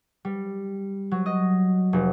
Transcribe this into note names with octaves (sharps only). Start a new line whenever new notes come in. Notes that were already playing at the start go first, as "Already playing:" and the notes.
G3
F#3
D#5
F1